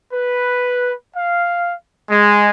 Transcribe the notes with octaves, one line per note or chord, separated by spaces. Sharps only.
B4
F5
G#3